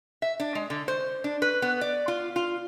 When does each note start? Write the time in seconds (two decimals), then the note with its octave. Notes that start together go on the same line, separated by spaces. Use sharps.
0.22 E5
0.40 D4
0.55 G#3
0.70 D3
0.88 C5
1.24 D4
1.42 B4
1.62 B3
1.81 D5
2.08 F4
2.36 F4